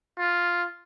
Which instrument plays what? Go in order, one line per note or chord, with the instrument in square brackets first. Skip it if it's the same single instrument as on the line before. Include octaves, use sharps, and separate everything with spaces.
[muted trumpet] F4